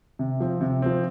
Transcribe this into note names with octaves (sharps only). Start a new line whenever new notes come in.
C3
F3 C4
C3
F3 C4